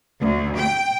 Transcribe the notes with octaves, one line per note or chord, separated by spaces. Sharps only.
D2
G5